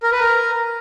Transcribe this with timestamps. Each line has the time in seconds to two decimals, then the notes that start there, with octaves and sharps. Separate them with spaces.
0.03 A#4
0.12 B4
0.20 A#4